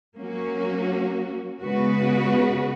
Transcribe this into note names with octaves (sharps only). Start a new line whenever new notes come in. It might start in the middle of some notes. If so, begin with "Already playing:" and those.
F#3 A#3 C#4 F#4
C#3 G#3 B3 F#4 B4